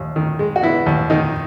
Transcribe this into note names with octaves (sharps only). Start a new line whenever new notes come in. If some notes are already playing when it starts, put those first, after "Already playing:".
Already playing: D#2
D#3
G#3
F#4
B3 E4
D#2
D#3 D#4